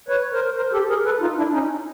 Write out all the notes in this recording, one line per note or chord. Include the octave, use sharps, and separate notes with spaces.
B4 C#5
A#4 C5
A#4 C5
G4 A4
G#4 A#4
A4 B4
D#4 F4
D4 E4
C#4 D#4